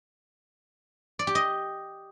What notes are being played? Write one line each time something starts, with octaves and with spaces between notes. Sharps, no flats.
D5
G4
D#5